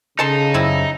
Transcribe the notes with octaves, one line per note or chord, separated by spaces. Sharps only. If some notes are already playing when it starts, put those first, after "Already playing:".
C#3 D#4 A4 A5 C6
F#2 G3 C4 E4 A#6